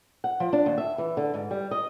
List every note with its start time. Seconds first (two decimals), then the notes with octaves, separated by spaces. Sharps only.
0.24 F#5
0.40 F3
0.53 D4
0.66 D#2
0.78 E5
0.98 E3
1.17 D3
1.34 G#2
1.51 G3
1.71 D#5